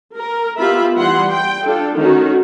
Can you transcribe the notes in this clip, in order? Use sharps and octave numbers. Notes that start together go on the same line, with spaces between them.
A#4
B3 F4 G4 E5 B5
E3 G3 F#5 C6
G5
D4 F4 A4
D#3 A3 C#4 F#4